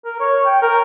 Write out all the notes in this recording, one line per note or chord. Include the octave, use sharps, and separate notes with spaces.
A#4
C#5
G5
A#4